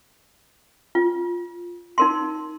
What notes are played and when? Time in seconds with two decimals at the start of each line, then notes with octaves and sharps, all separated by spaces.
0.95 F4
1.98 D#4 A#4 C6